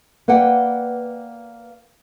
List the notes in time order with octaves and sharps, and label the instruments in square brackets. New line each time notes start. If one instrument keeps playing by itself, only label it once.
[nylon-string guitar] A#3 B4 D5 F#5 G5